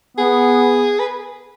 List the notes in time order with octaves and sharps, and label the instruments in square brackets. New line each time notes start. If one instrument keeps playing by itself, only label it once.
[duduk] B3 [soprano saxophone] G#4
[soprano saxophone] B4